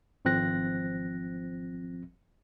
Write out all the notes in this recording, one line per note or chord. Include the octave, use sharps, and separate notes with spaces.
G#1 F3 C4 F#6 A#6